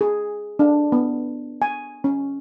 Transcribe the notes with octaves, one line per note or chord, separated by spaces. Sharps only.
G#4
D4
B3
G#5
C#4